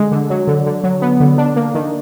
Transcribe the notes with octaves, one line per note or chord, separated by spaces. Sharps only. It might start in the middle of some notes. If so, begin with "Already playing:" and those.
Already playing: D3 G#3
D3
F#3
D3
D3
F#3
B3
D3
D4
A#3
D#3